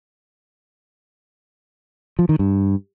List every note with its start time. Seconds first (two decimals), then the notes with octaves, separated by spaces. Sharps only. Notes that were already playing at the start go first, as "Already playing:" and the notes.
2.19 F3
2.29 D#3
2.39 G2